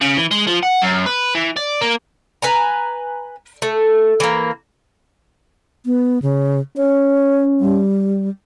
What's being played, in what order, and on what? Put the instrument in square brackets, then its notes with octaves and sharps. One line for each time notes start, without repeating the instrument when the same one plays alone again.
[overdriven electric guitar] C#3
E3
G#3
F3
F#5
F#2
B4
E3
D5
A#3
[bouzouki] B4 G#5 A#5
A3
E3 A#3
[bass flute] B3
C#3
[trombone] C#4 [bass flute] C#5
[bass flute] G3